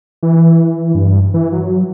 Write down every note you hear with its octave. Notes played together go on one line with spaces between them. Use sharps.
E3
G2
E3
F#3